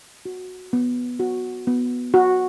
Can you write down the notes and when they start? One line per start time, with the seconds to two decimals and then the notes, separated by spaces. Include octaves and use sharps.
0.25 F#4
0.73 B3
1.20 F#4
1.67 B3
2.14 F#4